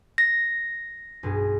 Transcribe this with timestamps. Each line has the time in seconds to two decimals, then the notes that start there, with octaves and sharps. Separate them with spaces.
0.18 A#6
1.23 B1 G2 G#4